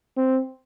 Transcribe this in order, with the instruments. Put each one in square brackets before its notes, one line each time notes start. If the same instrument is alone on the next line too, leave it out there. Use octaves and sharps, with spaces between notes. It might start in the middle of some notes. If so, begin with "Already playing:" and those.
[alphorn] C4